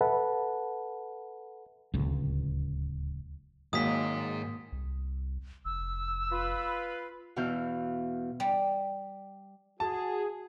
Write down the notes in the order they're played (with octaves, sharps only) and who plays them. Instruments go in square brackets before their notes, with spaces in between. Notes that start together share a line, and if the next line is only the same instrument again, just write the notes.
[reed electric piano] A4 B4 E5 F#5 A5 B5
[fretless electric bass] D1 C#2
[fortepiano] G#1 F#3 [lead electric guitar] G#2 G#4 [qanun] A#3 [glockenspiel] D#6 B6
[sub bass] C2
[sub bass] F1 [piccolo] E6
[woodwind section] F4 B4
[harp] E2 B2 E3 F5 G6
[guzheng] G3
[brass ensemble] F#4 G#4 [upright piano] A5